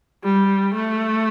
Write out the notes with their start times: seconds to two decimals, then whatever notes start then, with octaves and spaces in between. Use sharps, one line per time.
0.24 G3
0.75 A3